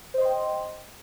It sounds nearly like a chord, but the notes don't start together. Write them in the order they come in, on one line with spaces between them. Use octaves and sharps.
C5 D#5 C6 G5